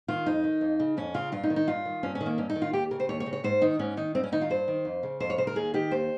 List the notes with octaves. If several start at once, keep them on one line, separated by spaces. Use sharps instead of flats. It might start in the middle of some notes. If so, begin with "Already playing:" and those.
D#3 F4
F2 D#4
D#3
F2
C#3
F2 C#4
C#3 F4
G2 F4
D#4
D#3
D#4
G2 F4
D#3
G2 C#4
C#4
D#3
A#3
G2 C#4
D#4
D#3
F4
D#2 G4
C#3 A#4
C5
D#2 C#5
C#5
C#3
C#5
G#2 C5
D#3 D#4
G#2 C#4
D#3 D#4
G2 C4
C#4
D#3 D#4
F4
G2 C5
D#3
F2
C#3
F2 C5
C#5
C#3 C5
A#4
D#2 G#4
D#3 G4
D#2 C5